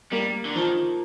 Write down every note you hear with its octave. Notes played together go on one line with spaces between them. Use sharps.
G3 A#3
D3
D#3 F3